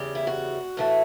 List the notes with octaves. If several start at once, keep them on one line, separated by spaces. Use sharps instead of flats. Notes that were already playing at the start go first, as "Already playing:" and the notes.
Already playing: E2 C#3 G3 G4
E4
F#4
A2 E3 A3